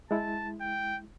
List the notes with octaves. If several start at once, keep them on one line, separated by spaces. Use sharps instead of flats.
G#3 E4 A5
G5